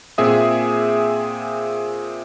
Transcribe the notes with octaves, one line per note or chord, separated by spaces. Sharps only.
A#2 C4 G#4 E5 D#6